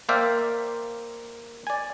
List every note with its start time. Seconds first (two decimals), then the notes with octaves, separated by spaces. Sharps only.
0.09 A#3 C5 D5 E5 F5 G5
1.67 D5 G#5